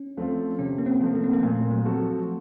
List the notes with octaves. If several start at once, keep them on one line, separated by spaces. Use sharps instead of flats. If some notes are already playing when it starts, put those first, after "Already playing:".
Already playing: C#4
F3 A3 C4 F4
C3 C#4
A#3
C4
F3 A3
A#3
C4
A#3
A#2 A3
F#3
F3 C4 F#4 A4